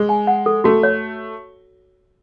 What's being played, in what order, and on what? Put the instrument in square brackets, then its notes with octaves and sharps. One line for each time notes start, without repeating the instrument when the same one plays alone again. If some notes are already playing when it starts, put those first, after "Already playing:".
Already playing: [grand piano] G#3 [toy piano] G#4
[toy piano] G#5
F#5
A4
[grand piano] A3 [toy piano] F#4
[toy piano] C#5